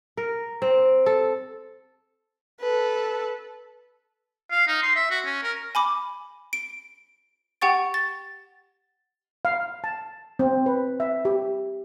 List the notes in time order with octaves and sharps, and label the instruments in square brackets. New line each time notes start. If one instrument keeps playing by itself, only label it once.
[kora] A#4
C4
A4
[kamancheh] A4 B4
[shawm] F5
D#4
C6
E5
F#4
C#4
A#4
[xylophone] G#5 B5 D6
D7
G4 F#5 G5 C#6 A6
A6
[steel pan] F5
A5
C4
B4
E5
G4